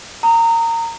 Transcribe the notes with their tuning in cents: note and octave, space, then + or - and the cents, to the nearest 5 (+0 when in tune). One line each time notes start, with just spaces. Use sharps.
A#5 -20 D#6 +15